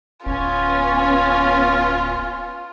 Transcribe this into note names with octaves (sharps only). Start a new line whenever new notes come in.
D1 B3 C#4 F4 G#5